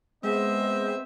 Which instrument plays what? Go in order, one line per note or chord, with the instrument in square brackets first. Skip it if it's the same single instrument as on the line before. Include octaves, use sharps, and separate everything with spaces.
[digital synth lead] G#3 [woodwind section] B3 C5 D#5 [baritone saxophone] C4 [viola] E5